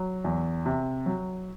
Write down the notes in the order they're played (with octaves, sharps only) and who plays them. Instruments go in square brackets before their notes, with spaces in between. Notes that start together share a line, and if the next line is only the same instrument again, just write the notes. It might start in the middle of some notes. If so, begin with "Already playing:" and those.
Already playing: [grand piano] F#3
E2
C3
F#3